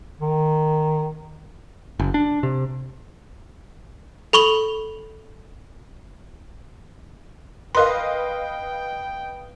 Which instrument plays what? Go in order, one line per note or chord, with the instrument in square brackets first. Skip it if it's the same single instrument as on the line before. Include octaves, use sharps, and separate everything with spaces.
[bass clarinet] D#3
[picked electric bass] F#1
D4
C3
[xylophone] A4 B5 C#6 F7 F#7
[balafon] A#4 C6 [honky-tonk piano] B4 D#5 F5 [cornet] G5